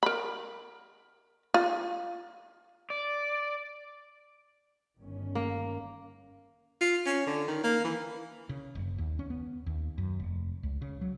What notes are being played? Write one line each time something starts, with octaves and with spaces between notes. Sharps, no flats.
A#4 B5
F4
D5
G1 D#3 C#4
A#3
F4
C#4
D3
D#3
A#3
E3
C#3
F#1
D#2
C#4
B3
D#2
F#2
F1
C#2
C#3
F#3